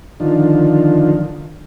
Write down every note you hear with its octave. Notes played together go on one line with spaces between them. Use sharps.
D3 D#3 F3